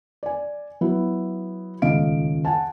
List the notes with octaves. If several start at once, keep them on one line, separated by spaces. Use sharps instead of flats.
D5 G#5
F#3 B3 E4
D#1 C#2 D#5 F5 D7
F#5 G#5 A5